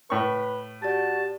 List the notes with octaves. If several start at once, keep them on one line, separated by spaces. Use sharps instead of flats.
A2 B4 C#6
F#4 G4 D5 A5